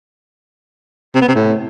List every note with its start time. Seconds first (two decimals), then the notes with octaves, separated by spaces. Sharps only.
1.15 C3
1.22 B3
1.28 C3
1.35 A2